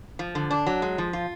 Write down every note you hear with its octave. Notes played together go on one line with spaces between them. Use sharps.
F3
D3
D4
F#3
G#3
F3
F4